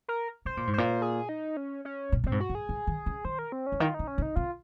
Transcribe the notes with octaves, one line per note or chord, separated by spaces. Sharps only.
A#4
C3 C5
A#2
G#2
A#2 C5
G#4
D#4
C#4
C#4
A#2
A#2 C4
G#2
F#4
G#2
G#4
G#2
D#3
C#3
D#3 C5
A#4
C4
C#4
C#3
D#3 F4
C#3 D#4
C#4
C3
D#4
C3 F4